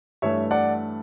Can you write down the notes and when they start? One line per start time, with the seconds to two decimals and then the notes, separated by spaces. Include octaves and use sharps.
0.22 G2 E3 A3 C#5 E5
0.51 D5 F#5